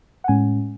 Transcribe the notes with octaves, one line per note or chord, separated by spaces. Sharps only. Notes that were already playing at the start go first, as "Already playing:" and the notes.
F#5
A2 G#3 C#4 G#5